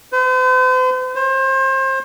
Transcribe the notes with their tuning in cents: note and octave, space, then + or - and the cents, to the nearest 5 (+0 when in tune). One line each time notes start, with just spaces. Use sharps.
C5 -45
C5 +30